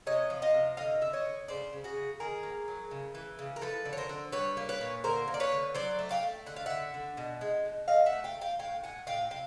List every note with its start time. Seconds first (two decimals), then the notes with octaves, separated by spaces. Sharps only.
0.07 C3 C#5 D#5
0.30 F3
0.42 D#5 F5
0.54 C3
0.77 D3 D#5 F5
1.01 D3 E5
1.13 C#5 D#5
1.25 D3
1.48 C#3 C5 D5
1.73 C#3
1.84 F#4 G#4
1.96 C#3
2.20 D#3 G#4 A#4
2.43 A#3
2.68 F#3
2.91 C#3
3.15 E3
3.39 C#3
3.56 A#4
3.61 F3 A4 B4
3.85 D3
3.93 C#5
3.97 A#4 C5
4.09 D3
4.32 G3 B4 C#5
4.57 A#3
4.69 B4 C#5
4.81 A#2
5.04 D3 A#4 C5
5.28 A#3
5.34 D5
5.40 B4 C#5
5.52 D3
5.74 F#3 C5 D5
5.99 A3
6.11 F5 G5
6.23 A3
6.46 D3 F#5
6.56 F5
6.66 D3 E5 F#5
6.94 D3
7.17 B2
7.41 G#3
7.65 B2
7.88 A3 D#5 F5
8.06 E5 F#5
8.13 A3
8.24 F5 G5
8.37 A3
8.41 F5 G5
8.59 A2 F5 G5
8.83 A2 F#5 G#5
9.07 A2 F5 G5
9.30 C3 F5 G5